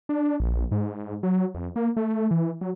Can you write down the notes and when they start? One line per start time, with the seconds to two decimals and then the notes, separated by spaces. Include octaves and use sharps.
0.09 D4
0.40 A#1
0.71 G#2
1.23 F#3
1.55 F2
1.76 A#3
1.97 A3
2.31 E3
2.61 F#3